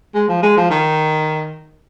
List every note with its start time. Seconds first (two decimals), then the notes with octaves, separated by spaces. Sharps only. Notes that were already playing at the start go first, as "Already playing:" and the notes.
0.15 G#3
0.28 F3
0.43 G#3
0.57 F3
0.70 D#3